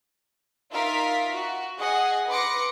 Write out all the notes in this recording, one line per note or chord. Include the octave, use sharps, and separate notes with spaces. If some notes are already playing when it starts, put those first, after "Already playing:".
D#4 F4 A#4 E5 F5 B6
F#4
G#4 D#5 F#5 G#5
B4 C6 D6 A#6 C#7